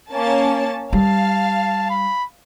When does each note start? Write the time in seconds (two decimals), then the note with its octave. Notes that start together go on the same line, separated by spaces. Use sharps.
0.13 A#3 C#4 A5
0.93 G3 F5 A5
1.90 B5